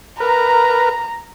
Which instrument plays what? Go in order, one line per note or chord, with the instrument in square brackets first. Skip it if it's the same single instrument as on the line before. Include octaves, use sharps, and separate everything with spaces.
[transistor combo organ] A#4 B4 [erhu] A#5